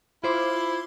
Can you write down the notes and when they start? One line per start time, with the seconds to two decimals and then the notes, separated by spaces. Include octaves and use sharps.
0.24 E4 F4 C5 D6